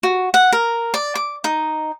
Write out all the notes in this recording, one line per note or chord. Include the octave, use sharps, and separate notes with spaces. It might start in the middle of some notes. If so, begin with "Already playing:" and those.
F#4
F#5
A#4
D5
D6
D#4